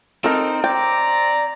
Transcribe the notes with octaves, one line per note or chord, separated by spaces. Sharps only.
C4 D#4 A4 A#4
C4 D5 G5 A#5